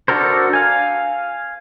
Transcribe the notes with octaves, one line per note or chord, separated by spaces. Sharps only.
D4 F#4 A4 A#4 C5
F5 G#5